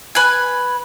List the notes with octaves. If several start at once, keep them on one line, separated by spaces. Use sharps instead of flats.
B4 G#5